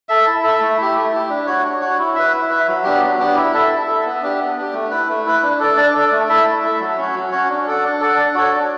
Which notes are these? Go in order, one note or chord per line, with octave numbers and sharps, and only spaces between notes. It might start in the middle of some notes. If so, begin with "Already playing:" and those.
A4 E5
E4
A4 E5
A3
E4 G4
A3
E4 G4
D4
F#4 C#5
D4
F#4 C#5
E4
B4 E5
E4
B4 E5
F#3
B3 D4 G4
F#3
B3 D4 G4
E4
A4 E5
E4
A4 E5
B3
D4 G4
B3
D4 G4
A3
E4 B4
A3
E4 B4
D4
A4 D5
D4
A4 D5
A3
E4 A4 E5
A3
E4 A4 E5
F#3
C#4 F#4 C#5
F#3
C#4 F#4 C#5
D4
A4 D5 F#5
D4
A4 D5 F#5
D4
F#4 A4 C#5
D4